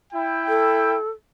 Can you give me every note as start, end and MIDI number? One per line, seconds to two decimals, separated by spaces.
0.13 0.96 64
0.13 0.96 79
0.48 1.10 69